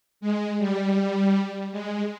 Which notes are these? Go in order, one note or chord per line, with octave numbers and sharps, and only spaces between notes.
G#3
G3
G#3